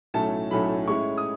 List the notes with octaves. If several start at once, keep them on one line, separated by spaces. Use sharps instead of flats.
B1 A2 F#3 A3 C#4 A5
B1 A2 F#3 A3 C#4 B5
A2 G#3 C#4 E4 C#6
D#6